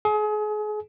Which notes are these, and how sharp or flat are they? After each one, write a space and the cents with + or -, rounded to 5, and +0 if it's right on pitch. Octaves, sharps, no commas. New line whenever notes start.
G#4 +35